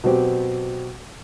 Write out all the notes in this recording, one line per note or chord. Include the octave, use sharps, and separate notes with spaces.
B2 F#3 C4 G4